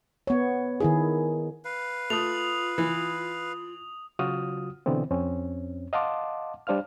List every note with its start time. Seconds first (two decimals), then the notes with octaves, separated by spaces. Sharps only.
0.27 B3 C#5
0.80 D#3 E4 G#4
1.65 B4 F5
2.10 A3 F4 D#6 F7
2.78 E3
4.19 C#3 F#3 F4 F#4 D#6 F6
4.86 B2 D3 E3 B3 C4
5.11 F2 C4 C#4
5.93 D#5 F5 F#5 A5 C6 D6
6.67 G3 D4 C5 F5 F6